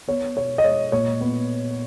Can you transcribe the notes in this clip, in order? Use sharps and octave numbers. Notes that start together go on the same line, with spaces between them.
B3 C#5
B2 C#5
D#5
G#3 C#5
A#2 C#5
B3